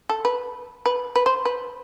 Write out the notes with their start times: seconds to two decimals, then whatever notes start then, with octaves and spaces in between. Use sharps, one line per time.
0.09 A4
0.25 B4
0.86 B4
1.16 B4
1.26 C5
1.45 B4